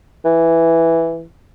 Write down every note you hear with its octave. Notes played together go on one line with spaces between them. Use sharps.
E3